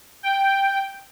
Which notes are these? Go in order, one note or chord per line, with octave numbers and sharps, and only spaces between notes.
G5